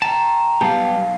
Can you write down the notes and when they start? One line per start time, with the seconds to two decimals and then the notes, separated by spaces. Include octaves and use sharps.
0.02 G5 A5 A#5
0.61 B1 G3 B3 G4 F5 A5